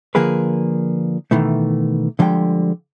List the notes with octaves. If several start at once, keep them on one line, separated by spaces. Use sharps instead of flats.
D3 F3 A#3 G#4 A#4 B4
B2 D#3 E3 A3
D3 F3 G3 G#3 G5